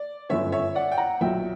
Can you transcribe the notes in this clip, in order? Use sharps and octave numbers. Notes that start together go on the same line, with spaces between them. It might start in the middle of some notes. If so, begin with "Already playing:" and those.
Already playing: D5
G1 F#2 D3 C#5 E5
C#5 E5
D5 F#5
G5
F#5 A#5
B1 A#2 F#3 E5 G5